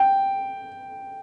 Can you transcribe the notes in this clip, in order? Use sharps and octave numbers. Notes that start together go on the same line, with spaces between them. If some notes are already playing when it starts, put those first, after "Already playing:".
Already playing: G5